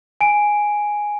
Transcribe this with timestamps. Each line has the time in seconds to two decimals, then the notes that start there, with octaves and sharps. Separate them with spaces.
0.21 G#5 D7